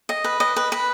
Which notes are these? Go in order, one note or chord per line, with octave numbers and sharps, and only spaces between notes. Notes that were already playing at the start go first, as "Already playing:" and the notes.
D#5
B4
D#5
B4
B4